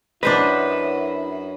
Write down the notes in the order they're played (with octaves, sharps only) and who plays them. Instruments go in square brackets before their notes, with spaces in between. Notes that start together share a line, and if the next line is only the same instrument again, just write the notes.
[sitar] F#2 [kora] D4 C5 D#5 [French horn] E4 [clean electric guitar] B4